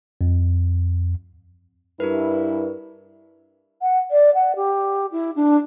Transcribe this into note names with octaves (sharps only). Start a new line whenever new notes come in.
F2
G2 E4 G4 A#4 B4
F#5
D5
F#5
G4
E4
D4